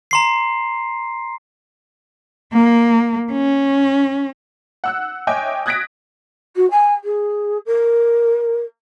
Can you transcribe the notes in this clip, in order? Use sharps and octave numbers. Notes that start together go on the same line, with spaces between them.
A#5 C6 C7
A#3
C#4
F#5 E6 F#6
C#5 D#5 E5 G5 G#5 D6
D#6 F#6 G#6 A#6 B6 D7
F#4
G#5
G#4
A#4